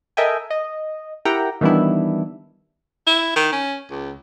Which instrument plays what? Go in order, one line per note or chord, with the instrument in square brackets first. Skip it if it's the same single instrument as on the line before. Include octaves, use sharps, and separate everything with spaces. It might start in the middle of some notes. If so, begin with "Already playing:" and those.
[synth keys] A4 A#4 D#5 E5 G5 G#5
D#5
E4 G4 A#4 F#5 G5 A#5
D#3 E3 G3 B3 D4 E4
[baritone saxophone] E4
D#3
C#4
C#2